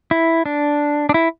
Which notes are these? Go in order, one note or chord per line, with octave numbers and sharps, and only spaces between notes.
E4
D4
D4
E4